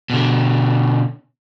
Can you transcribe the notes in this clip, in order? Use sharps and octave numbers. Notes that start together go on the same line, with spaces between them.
B2 D3